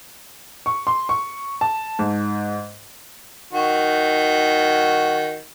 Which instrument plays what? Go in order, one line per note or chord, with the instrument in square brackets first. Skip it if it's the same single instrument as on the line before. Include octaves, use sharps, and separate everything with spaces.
[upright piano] C#6
C6
C#6
A5
G#2
[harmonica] D#3 F#4